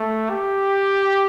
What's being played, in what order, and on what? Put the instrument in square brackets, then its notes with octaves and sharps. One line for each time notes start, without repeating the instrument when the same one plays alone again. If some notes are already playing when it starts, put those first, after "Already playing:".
Already playing: [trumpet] A3
G4